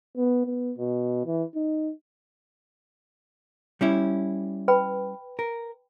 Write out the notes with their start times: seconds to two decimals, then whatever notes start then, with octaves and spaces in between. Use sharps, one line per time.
0.17 B3
0.46 B3
0.78 B2
1.26 E3
1.55 D#4
3.81 G3 C#4 E4
4.68 B4 G5 B5
5.39 A#4